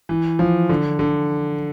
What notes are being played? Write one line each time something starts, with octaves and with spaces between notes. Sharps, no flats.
E3
F3
D3
D3